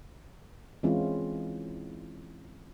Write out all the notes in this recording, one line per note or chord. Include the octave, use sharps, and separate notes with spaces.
E3 G#3 C4 C#4 E4 F4